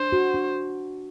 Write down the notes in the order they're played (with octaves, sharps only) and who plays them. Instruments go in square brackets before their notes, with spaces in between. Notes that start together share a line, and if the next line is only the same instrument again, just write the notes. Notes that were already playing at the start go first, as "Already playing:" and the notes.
Already playing: [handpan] D4 [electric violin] C5
[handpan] F#4
D4